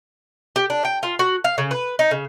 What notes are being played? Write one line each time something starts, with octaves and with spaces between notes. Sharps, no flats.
G4
D4
G5
F4
F#4
F5
C#3
B4
D#4
C#3